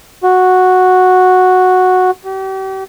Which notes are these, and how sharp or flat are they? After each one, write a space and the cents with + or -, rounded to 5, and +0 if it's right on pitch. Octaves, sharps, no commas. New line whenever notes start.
F#4 -5
G4 -40